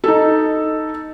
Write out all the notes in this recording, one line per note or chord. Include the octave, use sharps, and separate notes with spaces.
D#4 A4